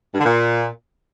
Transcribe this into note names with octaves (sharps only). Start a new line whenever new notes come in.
G2
D3
A#2